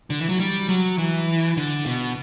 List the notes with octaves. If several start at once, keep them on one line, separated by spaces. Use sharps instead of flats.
D3
E3
F#3
G3
F#3
E3
D3
B2